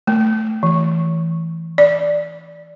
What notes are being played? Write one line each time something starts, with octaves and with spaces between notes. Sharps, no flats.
A3
E3
D5